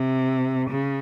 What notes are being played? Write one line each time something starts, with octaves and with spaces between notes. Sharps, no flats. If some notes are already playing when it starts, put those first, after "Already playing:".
Already playing: C3
C#3